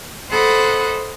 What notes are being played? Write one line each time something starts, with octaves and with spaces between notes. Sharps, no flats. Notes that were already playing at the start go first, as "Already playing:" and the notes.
A4 C5 D#5 F#5 B5